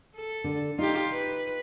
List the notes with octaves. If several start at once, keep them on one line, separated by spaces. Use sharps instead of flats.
A4
D3
D#4 F4 G4
B4